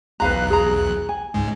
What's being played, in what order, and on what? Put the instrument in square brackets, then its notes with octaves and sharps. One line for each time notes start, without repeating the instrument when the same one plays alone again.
[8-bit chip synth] B1 E2 F#6 [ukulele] B4 F5 A#5
[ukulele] G#4 A#5
G#5
[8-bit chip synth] C#2 G#2 G#3